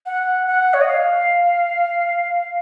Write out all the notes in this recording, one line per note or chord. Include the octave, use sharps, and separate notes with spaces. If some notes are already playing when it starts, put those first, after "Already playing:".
F#5
F#5
C#5
D#5
F5